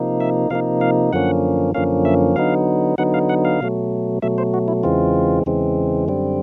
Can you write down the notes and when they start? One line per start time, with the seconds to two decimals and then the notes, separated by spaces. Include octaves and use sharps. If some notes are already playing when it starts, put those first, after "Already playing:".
Already playing: C3 F3 A#3 D#4
0.20 E5
0.50 C3 F3 A#3 D#4 F5
0.81 F5
1.13 F#2 D3 F3 A#3 C#4 F#5
1.74 F#2 D3 F3 A#3 C#4 F5
2.05 E5
2.36 D3 F#3 B3 D#4 F5
2.98 D3 F#3 B3 D#4 F#5
3.14 F5
3.29 F#5
3.45 F5
3.61 B2 F#3 A3
4.22 B2 F#3 A3 E5
4.38 C5
4.54 F#4
4.68 E4
4.83 E2 C#3 E3 G#3 C4 F4
5.46 E2 C#3 E3 G#3 C4
6.08 F#2 D3 G3 C4